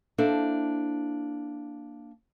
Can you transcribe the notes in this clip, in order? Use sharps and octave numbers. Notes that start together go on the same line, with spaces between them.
A#3 D4 E4 A4 C5